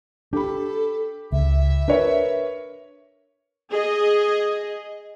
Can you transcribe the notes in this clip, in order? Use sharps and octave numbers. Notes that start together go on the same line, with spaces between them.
D4 G4 A4 B5
C#2 E5
D4 A#4 B4 C#5
G#4 D#5